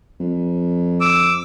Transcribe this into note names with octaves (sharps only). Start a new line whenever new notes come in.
F2
D6 E6